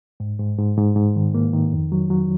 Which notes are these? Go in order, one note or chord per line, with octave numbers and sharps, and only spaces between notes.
G#2
G#2
G#2
G#2
G#2
D#3
A#3
D#3
F2
F#3
F#3